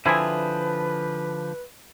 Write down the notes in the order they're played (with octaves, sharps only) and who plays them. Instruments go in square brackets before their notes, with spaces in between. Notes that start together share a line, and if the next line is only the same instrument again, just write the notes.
[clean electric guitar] D3 F3 [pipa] C4 G#4 [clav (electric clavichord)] E4 [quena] B4